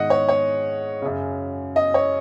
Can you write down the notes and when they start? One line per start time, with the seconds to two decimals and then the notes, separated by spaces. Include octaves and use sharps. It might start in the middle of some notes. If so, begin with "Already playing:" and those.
Already playing: G#2 D#3 D#5 F#5
0.10 C#5
0.29 C#5
1.02 F#2 C#3
1.76 D#5
1.94 C#5